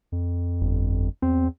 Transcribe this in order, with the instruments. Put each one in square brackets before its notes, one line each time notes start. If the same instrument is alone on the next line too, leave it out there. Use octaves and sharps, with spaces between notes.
[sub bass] F2
[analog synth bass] G1
[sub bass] E2 [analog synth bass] C4